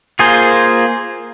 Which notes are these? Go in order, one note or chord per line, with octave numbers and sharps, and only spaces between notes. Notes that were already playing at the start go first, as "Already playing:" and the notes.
A#3 F4 G#4 C5